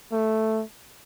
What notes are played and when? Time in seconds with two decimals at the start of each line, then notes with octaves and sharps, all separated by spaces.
0.12 A3